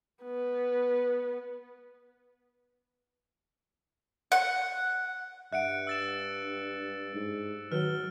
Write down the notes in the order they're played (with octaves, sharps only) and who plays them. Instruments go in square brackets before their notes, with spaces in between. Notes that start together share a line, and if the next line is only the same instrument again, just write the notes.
[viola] B3
[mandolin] F#5
[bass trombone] G2 [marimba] E5 F#5 [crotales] F#6 C#7 D7
[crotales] E6 A6 E7
[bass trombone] G#2
[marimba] D#3 B4 [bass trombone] F#3 [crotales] F6 G7